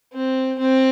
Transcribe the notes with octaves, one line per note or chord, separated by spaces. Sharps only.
C4
C4